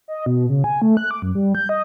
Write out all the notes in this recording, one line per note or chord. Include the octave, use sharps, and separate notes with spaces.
D#5
B2
C#3
G#5
A3
F#6
D6
F#2
G3
G6
D#5